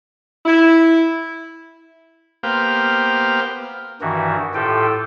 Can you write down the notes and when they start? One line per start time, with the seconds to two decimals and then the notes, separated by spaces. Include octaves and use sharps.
0.46 E4
2.43 A#3 B3 G4 C5 F5
4.01 G2 D#3 E3 F#4
4.55 A2 F4 G4 A4 G5